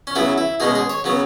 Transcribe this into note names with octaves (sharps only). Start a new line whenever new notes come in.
C#4
C#3 F#3 B3 E4
E4
B2 G#3 C#4 G#4
G#4
C#5
C#3 F#3 B3